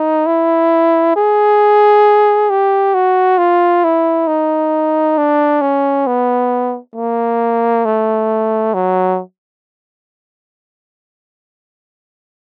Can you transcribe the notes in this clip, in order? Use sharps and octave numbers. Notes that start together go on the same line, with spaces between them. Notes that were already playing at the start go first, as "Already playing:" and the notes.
Already playing: D#4
E4
G#4
G4
F#4
F4
E4
D#4
D4
C#4
B3
A#3
A3
F#3